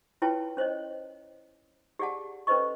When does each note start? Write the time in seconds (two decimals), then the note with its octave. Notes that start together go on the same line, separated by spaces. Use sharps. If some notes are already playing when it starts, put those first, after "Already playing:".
0.22 E4 F4 B4 C#5 G5 A5
0.57 C#4 C5 C#5 D#5
1.99 G4 G#4 D5 F#5 A5
2.47 C#4 A4 B4 C5 D#5 C#6